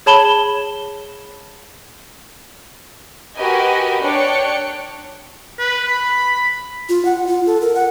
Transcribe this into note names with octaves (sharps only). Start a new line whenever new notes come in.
G#4 C#5 A5 B5 E7 G7
F#4 G4 A#4 B4 D#5 G#5
D4 C#5 G5 D6 F#6 C#7
B4
B5
F4
F#5
F4
A4
A#4
F#5